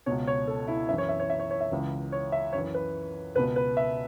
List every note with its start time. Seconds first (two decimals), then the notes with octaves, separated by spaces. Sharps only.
0.06 C#2 B2 C#5
0.27 C#5
0.47 A4
0.68 E4
0.88 F#2 E5
0.93 E3
0.98 C#5
1.09 E5
1.19 C#5
1.30 E5
1.39 C#5
1.51 C#5
1.61 E5
1.71 C#2 C#3 E3
2.12 C#5
2.32 E5
2.53 F#2 C#5
2.58 E3
2.74 B4
3.35 C#2 B2 B4
3.56 B4
3.77 E5